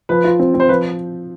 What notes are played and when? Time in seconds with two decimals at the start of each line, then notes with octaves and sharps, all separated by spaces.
0.09 F3 B4
0.24 F4
0.39 C4
0.54 C4
0.60 C5
0.69 F3 B4